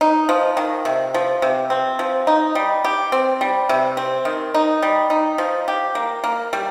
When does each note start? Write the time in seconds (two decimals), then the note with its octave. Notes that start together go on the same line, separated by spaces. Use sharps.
0.01 D#4
0.29 F3
0.57 D#3
0.85 C3
1.14 F3
1.42 C3
1.70 C4
1.99 F3
2.27 D#4
2.55 G3
2.85 G4
3.12 C4
3.41 G3
3.69 C3
3.97 C4
4.25 D#3
4.54 D#4
4.82 G3
5.10 D#4
5.38 F3
5.68 G4
5.95 A#3
6.24 A#3
6.53 G3